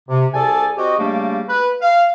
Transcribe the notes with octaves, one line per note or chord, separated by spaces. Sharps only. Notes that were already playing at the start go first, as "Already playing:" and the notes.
C3
C2 G#4 A4 D5 G#5 A5
C4 F#4 G4 D#5
C#3 G3 A3 A#3 D4 G4
B4
F5